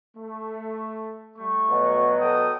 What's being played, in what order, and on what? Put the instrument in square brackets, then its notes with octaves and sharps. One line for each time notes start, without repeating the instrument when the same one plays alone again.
[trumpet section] A3
G3 A3 C#6
[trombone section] B2 F#3
[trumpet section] A4 G5 D#6